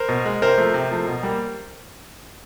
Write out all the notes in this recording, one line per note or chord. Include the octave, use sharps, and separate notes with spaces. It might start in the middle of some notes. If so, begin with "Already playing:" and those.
Already playing: A#4 C5
B2
G#3
C3 A#4 C5
F3 A3
C3
F3 A3
B2
G3 A#3